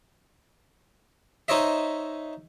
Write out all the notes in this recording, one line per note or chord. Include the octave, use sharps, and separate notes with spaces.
D#4 C5 C#5 D#5 E5